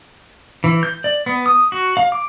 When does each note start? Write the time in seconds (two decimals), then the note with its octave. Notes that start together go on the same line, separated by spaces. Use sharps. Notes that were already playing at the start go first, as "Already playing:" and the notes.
0.64 E3
0.83 G6
1.04 D5
1.26 B3
1.46 D#6
1.72 F#4
1.97 F5
2.12 D6